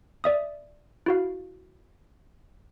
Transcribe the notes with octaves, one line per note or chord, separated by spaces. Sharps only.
D5 E5 D#6
E4 F#4 F5